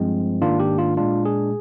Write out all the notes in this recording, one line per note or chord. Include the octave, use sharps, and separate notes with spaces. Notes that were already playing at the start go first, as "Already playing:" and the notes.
Already playing: G2 F3 G#3 C4
G#2 D#3 A#3 D4 F4
G4
F4
A#2 G#3 D4 F4
G#4